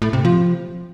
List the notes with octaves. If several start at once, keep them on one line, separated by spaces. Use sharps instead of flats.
A2
C3
F3